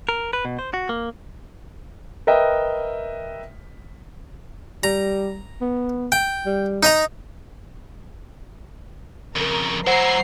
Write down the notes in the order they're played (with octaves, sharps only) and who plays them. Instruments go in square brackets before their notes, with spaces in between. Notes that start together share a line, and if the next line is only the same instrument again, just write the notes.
[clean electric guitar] A#4
B4
B2
C5
F#4
A#3
[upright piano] A#4 B4 D#5 E5 G5
[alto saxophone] G3 [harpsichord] A#5
[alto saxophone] B3
[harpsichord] G5
[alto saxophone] G3
[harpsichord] D#4 D#5 A#5
[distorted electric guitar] F2 C#3 [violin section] A#4
[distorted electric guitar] F#3 E4 [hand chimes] C5 F#5 [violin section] A#5 C7